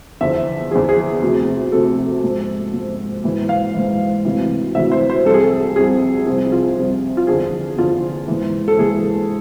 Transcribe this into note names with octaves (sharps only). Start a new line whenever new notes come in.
E2 D3 F3 E5
E2 D3 F3 G#4
G#4
D2 C3 F3
D2 C3 F3 A4
G#2 F3
G#2 F3
G#2 E3
F5
G#2 E3
D2 C3 E3
D2 C3 E3 E5
C5
C5
C2 C3 F3 A4
G#4
A4
C2 C3 F3 G#4
C2 C3 F3 G#4
F4
C2 C3 F3
F4
E2 D3 F3 G#4
E2 D3 F3 F4
G#2 E3
A4
G#2 E3 G#4